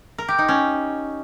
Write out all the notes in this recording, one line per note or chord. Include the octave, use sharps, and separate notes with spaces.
A#4
G4
D#4
C#4